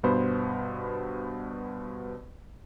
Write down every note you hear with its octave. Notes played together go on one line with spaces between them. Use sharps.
G2 B2 B3 C5 B5